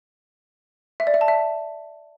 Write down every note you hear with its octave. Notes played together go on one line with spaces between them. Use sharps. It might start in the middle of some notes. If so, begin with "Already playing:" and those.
E5
D5
E5
A5
E5